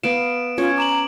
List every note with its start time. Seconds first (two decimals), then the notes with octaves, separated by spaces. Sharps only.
0.03 B3 F5 D7 E7
0.58 C#4 F4 C#5
0.78 A#5 D6 E7 F#7